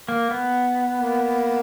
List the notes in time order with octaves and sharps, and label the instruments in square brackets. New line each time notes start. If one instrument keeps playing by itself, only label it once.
[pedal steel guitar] A#3
B3
[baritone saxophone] A#3